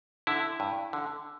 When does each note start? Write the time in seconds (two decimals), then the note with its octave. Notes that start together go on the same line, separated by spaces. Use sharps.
0.27 D3 E4
0.60 G2
0.93 D3